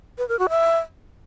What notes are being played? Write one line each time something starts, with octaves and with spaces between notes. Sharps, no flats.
B4
A#4
F#4
E5